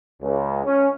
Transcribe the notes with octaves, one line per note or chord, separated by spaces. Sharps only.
C#2
C#4